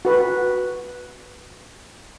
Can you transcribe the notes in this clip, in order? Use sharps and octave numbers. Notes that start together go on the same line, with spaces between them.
F#4 B4